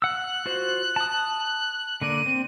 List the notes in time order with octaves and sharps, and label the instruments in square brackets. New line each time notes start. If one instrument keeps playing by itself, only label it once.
[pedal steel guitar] F#5 E6 [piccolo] F#6
[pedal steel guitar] F4 F#4 C5
A5 D#6
[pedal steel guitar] D3 A#3 D5 [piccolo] D#7
[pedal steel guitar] C4